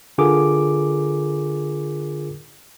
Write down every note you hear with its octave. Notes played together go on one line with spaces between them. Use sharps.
D3 F4 G#4 A#4 D6